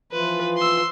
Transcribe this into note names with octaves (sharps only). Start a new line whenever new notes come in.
E3 F3 F4 B4
C6 E6